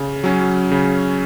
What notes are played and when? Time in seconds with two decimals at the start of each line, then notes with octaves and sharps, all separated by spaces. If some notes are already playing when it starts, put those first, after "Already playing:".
Already playing: C#3
0.24 F#3 C#4
0.72 C#3